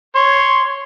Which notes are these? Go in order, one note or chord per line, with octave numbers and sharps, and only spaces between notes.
C#5 C6